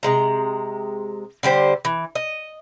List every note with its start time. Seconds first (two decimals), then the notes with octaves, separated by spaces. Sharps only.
0.03 C3 G#3 A#5
1.43 D3 G3 G4 C5
1.85 E3
2.15 D#5